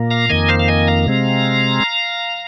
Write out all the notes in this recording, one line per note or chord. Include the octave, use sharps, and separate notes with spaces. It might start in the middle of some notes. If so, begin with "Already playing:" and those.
Already playing: A#2 A#3
F5 A#5
F2 D#3 A#3 D#5 G#5
C5 F5
F5
D#5 G#5
F5 A#5
C3 G#3 C4